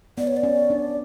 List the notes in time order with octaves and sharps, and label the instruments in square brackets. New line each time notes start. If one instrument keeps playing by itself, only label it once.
[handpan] B3 [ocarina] D5
[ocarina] C#5
D5
[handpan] C#4
D4